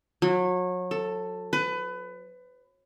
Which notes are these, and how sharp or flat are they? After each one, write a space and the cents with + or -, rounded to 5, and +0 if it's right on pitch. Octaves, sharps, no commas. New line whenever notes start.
F#3 -30
A4 +10
B4 +25